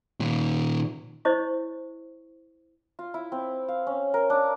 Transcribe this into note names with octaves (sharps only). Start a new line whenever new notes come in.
A#2 D#3
E4 C5 C#5 D#5 C#6
F4
E4
C4
F5
C#4
A#4
D4